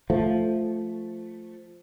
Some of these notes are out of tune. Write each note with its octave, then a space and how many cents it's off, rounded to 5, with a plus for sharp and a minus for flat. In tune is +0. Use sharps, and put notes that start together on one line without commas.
F3 +0 A3 +0